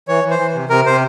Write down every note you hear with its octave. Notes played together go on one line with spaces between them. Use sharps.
E3 C#5
E3
C5
E3
C3
C3 A#4
C3 C5